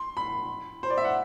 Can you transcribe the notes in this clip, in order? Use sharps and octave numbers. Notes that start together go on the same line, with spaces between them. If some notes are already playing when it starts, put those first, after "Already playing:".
Already playing: C6
B5
C5
D5
E5
F#5